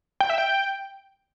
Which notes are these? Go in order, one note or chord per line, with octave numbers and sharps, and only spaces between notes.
G5
E5
G5